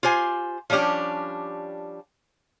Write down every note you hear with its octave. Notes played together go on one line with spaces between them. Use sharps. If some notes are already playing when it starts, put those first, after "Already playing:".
F4 G4 C5 G#5
F3 G3 C#4 D4 G4